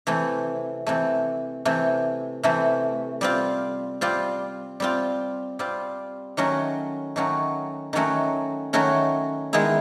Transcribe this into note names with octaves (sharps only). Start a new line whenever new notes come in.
C3 E3 A3
C3 E3 A3
C3 E3 A3
C3 E3 A3
G3 C4 F4
G3 C4 F4
G3 C4 F4
G3 C4 F4
D#3 F#3 A3 C#4 F#4
D#3 F#3 A3 C#4 F#4
D#3 F#3 A3 C#4 F#4
D#3 F#3 A3 C#4 F#4
D#3 G#3 B3 E4